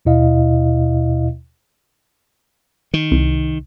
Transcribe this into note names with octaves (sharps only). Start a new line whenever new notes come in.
D#2 B2 E4 D#5 F5
D#3
C2